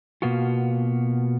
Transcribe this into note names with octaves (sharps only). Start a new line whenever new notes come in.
B2 A#3 B3 F4 F#4